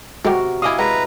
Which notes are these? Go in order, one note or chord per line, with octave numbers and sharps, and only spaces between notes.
C3 G#3 F#4 G4 A#4
E4 D#5 F5 G#5 D6 D#6
G#3 B4 F#5 A#5